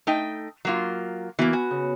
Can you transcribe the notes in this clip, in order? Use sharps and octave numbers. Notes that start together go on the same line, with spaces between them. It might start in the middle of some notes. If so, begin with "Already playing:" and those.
A3 D#4 G5
F#3 A#3 F4
E3 A#3 B3 F#4 B5
F#4 G#5 F#6
C#3